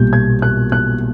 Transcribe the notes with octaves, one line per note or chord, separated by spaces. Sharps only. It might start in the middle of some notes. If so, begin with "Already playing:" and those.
Already playing: B1 A#2 G3 G6
G#6
F#6
F#6